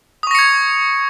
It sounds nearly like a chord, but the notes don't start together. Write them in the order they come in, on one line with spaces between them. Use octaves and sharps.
D#6 C#6 A#6 C#7 G#6